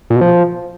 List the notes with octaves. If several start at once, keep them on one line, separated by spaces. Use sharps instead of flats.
A#2
B2
F3